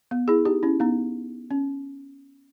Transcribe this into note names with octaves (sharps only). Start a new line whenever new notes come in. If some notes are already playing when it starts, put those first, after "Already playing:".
B3
E4 G#4
D#4 G4
C#4 E4
B3 D#4
C#4